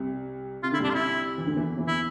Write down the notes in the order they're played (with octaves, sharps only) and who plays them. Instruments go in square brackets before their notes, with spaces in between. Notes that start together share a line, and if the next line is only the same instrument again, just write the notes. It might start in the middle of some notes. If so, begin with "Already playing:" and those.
Already playing: [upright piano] C2 C3
[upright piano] C3 [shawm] F4
[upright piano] D3 [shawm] E4
[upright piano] C2 C3 [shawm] D4
[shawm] F4
E4
[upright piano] E3
D2 D3
E2 E3
E2 E3
[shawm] E4